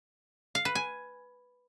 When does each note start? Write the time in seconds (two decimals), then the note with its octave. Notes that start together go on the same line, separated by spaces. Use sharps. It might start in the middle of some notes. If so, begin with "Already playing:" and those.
0.55 F5
0.65 B4
0.75 G#5